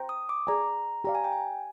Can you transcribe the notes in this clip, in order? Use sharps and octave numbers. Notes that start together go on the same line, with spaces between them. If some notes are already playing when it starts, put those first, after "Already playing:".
Already playing: C5 G5 A#5
D#6
D6
G#4 D5 G#5 A#5
G4 D5 F5 A#5
G#5
G5
G#5